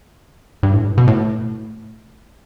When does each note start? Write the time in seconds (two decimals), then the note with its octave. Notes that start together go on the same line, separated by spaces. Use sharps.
0.63 G2
0.73 A2
0.84 G2
0.98 B2
1.07 A2